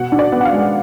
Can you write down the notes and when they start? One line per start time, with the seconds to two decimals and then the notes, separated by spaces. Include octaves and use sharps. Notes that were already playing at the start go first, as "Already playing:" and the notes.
Already playing: B2 F#5
0.12 D4
0.19 D5
0.32 B3
0.41 F#5
0.45 F5
0.52 G#3